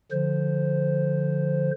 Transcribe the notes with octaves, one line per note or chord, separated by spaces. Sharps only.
D3 F3 C5